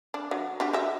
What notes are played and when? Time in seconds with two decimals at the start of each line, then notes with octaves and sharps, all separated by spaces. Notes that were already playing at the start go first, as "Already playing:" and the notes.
0.14 D4
0.31 F#3 D4
0.60 D4 F#4 G4
0.73 F#4 D#5 E5